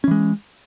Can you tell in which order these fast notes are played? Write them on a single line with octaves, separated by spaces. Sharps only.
C#4 E3 G#3